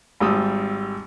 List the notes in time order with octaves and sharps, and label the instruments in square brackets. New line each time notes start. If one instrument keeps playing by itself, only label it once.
[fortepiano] G#1 G3 D#6 E6